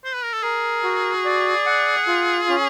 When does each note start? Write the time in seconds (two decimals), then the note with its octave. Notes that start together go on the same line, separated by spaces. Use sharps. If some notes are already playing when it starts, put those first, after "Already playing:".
0.05 C5
0.15 B4
0.24 A#4
0.33 A4
0.43 G#4 A#4
0.83 F#4
1.25 D5
1.66 F#5
2.07 F4
2.49 C#4